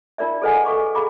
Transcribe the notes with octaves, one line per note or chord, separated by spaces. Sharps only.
D#4 F4 A#4 D5 E5
G#4 A4 B4 D#5 F#5 G#5
A4 F5 C#6 D6
G#4 F5 B5 D6